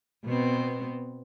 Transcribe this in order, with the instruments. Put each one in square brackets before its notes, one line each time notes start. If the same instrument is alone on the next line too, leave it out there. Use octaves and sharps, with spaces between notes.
[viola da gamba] B2 B3 C4